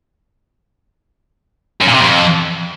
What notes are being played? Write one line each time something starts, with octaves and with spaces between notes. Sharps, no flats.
F#2
A#2
C3
F2